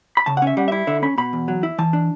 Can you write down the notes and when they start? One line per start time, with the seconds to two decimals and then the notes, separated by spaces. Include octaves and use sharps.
0.17 B5
0.26 C#3 A5
0.37 F#5
0.42 C#4 E5
0.57 G3 F#5
0.68 E5
0.72 E4
0.87 D3 E5
1.02 C#4 B5
1.18 B2 B5
1.33 E2
1.48 F#3
1.63 E4
1.78 E3 A5
1.93 D4